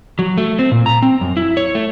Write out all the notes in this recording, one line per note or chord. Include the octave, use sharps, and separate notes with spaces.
F#3
A3
C4
A#2
A#5
C4
F#2
E4
C#5
A3